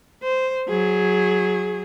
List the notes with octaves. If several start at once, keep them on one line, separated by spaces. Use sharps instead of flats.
C5
F#3 G#4